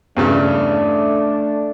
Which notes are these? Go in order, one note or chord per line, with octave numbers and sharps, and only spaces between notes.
E2 G2 C#3 A3 D4